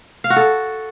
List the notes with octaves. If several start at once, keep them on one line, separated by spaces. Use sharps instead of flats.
F5
F#4
A4